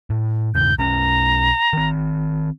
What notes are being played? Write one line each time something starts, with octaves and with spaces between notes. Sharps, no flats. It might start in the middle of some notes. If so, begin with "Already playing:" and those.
A2
E2 G#2 C#3 G6
B1 C#4 A#5
D#3 C4